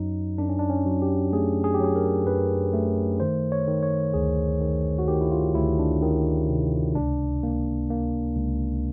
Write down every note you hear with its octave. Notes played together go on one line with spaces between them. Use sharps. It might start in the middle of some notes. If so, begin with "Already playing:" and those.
Already playing: F#2 F#3 D#4
F#2 D4
C#4
D4
C#4
F#3
G4
A3 G#4
G#4
G4
F#3 G#4
A#4
F#2 B4
A3
D#3 C5
C#5
D#3
C#5
D2 G#4
D#3
F#4
D#3 G4
E4
F4
D2 E4
D4
D#3
C3
C#2 D4
A#3
A#3
C#2